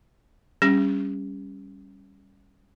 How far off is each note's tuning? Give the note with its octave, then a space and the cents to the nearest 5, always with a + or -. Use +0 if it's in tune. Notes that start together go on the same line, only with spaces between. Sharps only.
G3 +5 C#4 +0 G4 +45